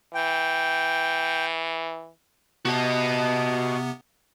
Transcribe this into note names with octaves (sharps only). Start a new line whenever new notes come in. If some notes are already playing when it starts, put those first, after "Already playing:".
E3 G5
C3 B3 F#4 D#5